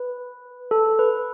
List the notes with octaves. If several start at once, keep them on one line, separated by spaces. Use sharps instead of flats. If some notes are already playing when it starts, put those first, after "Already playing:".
Already playing: B4
A4
B4